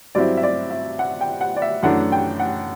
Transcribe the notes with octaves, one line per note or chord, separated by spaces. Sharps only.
G2 F#3 C4 E4 D5
E5
D5
E5
F#5
G5
F#5
D5
E5
F#2 E3 A3 D4 F#5
G5
F#5